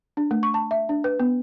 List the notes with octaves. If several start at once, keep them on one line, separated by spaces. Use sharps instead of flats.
D4
A3
C#6
A5
E5
D4
B4
B3